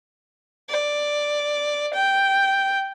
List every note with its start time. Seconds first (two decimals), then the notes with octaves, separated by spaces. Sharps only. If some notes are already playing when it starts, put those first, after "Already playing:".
0.69 D5
1.94 G5